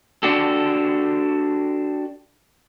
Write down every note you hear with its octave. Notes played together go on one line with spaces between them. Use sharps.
D4 F#4 G4 A4